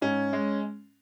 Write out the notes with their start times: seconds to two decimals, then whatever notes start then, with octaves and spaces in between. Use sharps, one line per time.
0.01 G#2 C#4
0.33 G#3